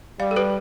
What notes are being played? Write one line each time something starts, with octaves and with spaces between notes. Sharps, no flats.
G3 D5 F5
A4
G4 B4